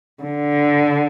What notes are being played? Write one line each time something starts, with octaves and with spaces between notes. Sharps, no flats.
D3